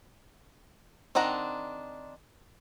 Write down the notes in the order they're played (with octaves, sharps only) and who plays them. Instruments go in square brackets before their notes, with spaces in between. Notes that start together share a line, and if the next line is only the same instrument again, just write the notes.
[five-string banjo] D#3 C4 D4 F#5 A#5